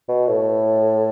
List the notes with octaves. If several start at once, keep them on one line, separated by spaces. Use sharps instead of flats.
B2
A2